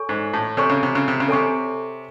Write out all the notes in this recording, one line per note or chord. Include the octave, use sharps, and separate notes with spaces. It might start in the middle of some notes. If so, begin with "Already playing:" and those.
Already playing: A4 C#5 G#5 C#6
G#2
A2
C3 A4 C#5 G#5 C#6
C#3
C3
C#3
C3
C#3
C3 A4 C#5 G#5 C#6